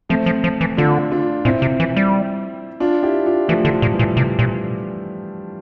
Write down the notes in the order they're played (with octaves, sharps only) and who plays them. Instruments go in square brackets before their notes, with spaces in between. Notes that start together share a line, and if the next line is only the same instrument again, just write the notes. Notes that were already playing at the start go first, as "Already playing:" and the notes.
[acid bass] F3 [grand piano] A3 C4
[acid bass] F3
F3
E3
[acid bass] D3 [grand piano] D4 F4
[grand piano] D4 F4
[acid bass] A#2 [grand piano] C4 E4
[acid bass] C3
E3
G3
[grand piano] D4 F4
E4 G4
D4 F4
[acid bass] E3 [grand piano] F3 A3
[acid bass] D3
[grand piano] F3
[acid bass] A#2
[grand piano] E3 G3
[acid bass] A#2
C3
A#2